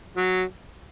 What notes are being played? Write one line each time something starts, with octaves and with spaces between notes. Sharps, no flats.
F#3